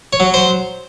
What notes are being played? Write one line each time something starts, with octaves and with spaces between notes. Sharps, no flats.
C#5
F#3
C5